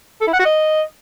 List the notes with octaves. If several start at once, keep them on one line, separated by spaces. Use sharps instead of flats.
A4
E4
F#5
F#4
D#5